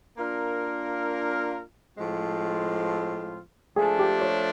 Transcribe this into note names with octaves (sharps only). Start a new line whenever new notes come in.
A#3 D4 F4 A#4
A2 F3 G#3 C4 F4
F3 A3 D4 G#4
G4
C#5